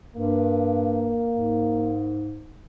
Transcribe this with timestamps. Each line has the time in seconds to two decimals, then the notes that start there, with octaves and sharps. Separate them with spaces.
0.16 G2 A#3
1.31 G#2